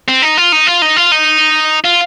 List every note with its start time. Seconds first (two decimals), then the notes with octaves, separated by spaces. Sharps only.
0.08 C4
0.22 D#4
0.37 F4
0.52 D#4
0.67 F4
0.82 D#4
0.96 F4
1.12 D#4
1.85 F4